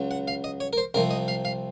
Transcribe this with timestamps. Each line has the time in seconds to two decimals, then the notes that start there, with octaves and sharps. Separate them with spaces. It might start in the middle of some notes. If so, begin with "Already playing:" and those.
Already playing: C#2 C#3 F#3
0.11 F#5
0.28 F5
0.44 D#5
0.60 C#5
0.73 A#4
0.78 C5
0.94 C2 C3 F3 A#4
1.11 D#5
1.28 F5
1.45 F5